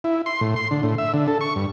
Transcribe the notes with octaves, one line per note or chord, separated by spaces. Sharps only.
E4
C6
A2
C6
D3
A2
E5
D3
A4
C#6
G2